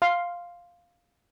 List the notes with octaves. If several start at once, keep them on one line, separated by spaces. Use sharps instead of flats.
F5 C6